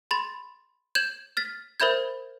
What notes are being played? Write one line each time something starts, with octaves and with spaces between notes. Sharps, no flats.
B5 C6 A6
G6 G#6 E7 F#7
F6 A6 B6
A#4 C5 E5 B5 G6 G#6